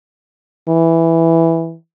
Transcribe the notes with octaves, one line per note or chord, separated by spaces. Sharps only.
E3